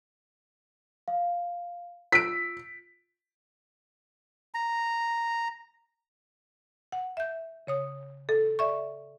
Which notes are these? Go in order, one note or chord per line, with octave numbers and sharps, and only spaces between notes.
F5
F4 E6 B6 D7
A#5
F#5
E5 G6
C#3 C#5 D#6
A4
D5 E5 C#6